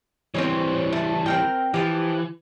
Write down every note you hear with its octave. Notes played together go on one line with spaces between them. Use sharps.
E3 G3 C4 C5 C#5
A3
C4 A#4 G5
E3 F3 G4